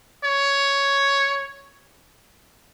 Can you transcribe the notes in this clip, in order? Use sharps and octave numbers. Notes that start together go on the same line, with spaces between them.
C#5